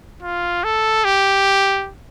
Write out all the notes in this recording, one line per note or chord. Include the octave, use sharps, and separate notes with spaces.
F4
A4
G4